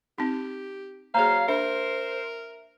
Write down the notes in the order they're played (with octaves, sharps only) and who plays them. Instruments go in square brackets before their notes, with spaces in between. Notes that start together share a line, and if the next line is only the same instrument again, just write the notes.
[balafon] C4 D#4 [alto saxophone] G4
[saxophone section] F#3 C#5 F5 [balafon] A#3 G#4 [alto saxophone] C5 [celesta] A#5
[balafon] D4 [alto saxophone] A#4 [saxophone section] C5 [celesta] E5